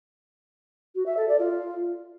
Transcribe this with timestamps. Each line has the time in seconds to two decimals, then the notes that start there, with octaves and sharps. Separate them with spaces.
0.95 F#4
1.06 E5
1.17 A4
1.28 D5
1.39 F4